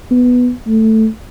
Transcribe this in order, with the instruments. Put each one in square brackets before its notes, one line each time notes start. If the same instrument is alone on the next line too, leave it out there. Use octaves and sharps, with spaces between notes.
[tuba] B3
A3